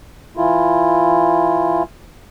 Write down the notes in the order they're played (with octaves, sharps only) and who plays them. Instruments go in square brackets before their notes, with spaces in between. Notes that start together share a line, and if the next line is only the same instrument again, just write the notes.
[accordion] E3 E4 F4